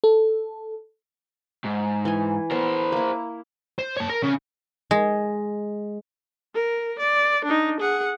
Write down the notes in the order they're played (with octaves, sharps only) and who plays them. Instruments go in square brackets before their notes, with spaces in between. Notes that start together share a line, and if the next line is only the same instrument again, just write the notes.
[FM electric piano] A4
[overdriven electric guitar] G#2
[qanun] E3 G#5
[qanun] B3 [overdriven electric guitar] A#4 C5
[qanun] A#3 E4
[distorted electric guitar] C5
C#5 A5
A#4
C#3
[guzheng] G#3
[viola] A#4
D5
D4 D#4
G#4 F#5